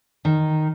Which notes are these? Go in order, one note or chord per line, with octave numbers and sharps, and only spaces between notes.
D#3